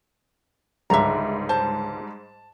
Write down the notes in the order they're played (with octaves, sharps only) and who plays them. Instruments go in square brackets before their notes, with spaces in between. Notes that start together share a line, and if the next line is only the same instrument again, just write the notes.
[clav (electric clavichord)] C#2 D3 [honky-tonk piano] G#2 G3 [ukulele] E5 A#5
[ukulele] C5 [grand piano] A5